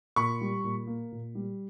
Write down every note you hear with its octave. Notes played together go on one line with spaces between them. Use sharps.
A#2 B5 C#6
G3
A#2
A#3
A#2
G3